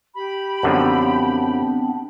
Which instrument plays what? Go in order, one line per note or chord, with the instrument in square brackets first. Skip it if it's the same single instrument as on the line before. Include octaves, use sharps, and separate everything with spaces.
[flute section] G4 B5
[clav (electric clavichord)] F#2 D3 F3 [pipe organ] B3 C4 D4